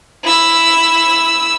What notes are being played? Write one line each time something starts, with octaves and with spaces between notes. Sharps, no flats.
E4 E6